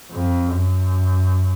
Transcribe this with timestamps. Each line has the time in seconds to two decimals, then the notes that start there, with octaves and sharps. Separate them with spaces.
0.11 F2
0.48 F#2